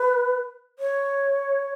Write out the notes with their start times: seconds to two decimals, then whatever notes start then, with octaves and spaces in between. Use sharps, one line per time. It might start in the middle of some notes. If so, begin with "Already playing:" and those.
Already playing: B4
0.79 C#5